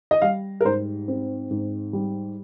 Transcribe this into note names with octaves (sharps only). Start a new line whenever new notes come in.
D#5
G3 F5
A#4
G#2 C5
C4
G#2
G3